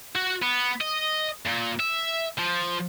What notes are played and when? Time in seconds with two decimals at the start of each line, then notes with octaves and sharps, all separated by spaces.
0.16 F#4
0.43 B3
0.81 D#5
1.47 A#2
1.80 E5
2.39 F3